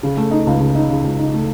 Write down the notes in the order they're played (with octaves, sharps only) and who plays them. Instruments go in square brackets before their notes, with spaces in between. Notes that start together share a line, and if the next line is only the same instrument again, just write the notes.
[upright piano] C#3
A3
D#4
C#2
C#3
D#4
C#3
C#2
D#4
A3